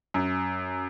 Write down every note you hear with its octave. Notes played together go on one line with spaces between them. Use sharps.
F#2